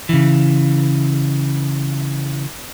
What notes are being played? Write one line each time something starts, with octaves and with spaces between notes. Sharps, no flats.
C#3 E3